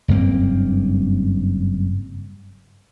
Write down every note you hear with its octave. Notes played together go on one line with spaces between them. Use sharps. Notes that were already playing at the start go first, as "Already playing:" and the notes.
F#1 G2 A#3 C4